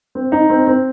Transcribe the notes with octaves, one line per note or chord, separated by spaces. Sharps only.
C4
D#4
C4
C4